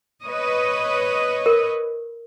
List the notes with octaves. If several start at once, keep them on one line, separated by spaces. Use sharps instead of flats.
B4 C#5 D#5
A#4